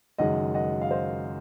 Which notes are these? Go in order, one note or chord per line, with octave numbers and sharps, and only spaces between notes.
F#1 F#2 D#3 G#3 D#5 F#5
D#5 F#5
F5
C5 D#5